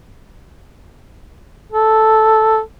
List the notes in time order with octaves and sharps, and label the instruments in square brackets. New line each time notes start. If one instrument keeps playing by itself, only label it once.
[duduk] A4